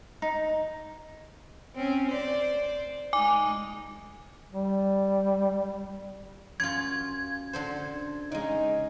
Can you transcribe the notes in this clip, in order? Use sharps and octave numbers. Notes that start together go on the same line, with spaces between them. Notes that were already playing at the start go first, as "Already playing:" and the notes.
D#4
C4 C#4
C5 D5
G#3 D#4 G#5 D6
G3
F#2 F4 G#6
D3 A4 C5
C#3 G#3 D#4